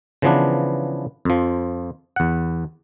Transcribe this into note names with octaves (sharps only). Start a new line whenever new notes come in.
C#3 E3 F3 B3 D4
F2 F3
E2 F#5